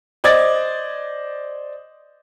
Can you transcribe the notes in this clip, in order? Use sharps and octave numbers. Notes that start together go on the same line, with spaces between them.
C5 D5 D#5 D6 G#6 A6